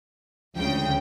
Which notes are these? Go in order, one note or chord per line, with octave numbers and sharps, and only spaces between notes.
D2 C#3 F3 G#3 G5